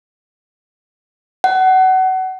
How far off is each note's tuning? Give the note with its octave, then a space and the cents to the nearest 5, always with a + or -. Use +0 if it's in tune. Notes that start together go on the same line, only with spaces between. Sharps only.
F#5 +25